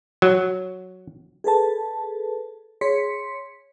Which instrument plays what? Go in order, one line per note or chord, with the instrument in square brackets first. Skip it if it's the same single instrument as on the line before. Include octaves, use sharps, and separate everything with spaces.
[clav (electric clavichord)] F#3
[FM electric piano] G#4 A4 B4 A5
G#4 C#5 C6 B6 C#7